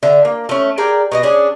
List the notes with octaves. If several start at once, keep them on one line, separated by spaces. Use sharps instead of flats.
D3 E5
A#3
A3 C#4
G#4 A#4 D5 G5
B2 G#4 D#5
C#4 D4 G#4